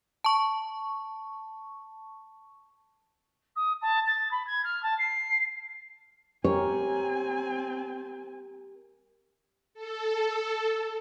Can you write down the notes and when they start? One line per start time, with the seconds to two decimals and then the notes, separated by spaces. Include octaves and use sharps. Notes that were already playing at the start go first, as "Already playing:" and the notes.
0.24 A5 C#6
3.55 D#6
3.81 A5
4.06 A6
4.31 B5
4.46 G#6
4.64 F6
4.82 A5
4.98 C7
6.45 C4 G4 A#4 C#5 G#5
9.74 A4